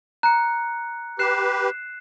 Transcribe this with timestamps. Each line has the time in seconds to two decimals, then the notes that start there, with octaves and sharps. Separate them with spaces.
0.23 A#5 F#6 C#7
1.19 G4 B4 F#6 C7 E7